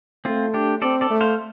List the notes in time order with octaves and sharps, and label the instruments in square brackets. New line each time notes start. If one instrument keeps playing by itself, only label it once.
[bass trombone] A3 [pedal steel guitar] C4 F4
[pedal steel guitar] D4 G4
[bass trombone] C4 [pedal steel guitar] A4 D5
[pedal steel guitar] A4 D5
[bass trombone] A3
[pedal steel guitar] C5 F5